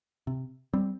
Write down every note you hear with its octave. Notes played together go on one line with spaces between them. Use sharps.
C3
G3 C4